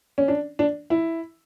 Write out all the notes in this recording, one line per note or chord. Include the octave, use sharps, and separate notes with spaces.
C#4
D4
D4
E4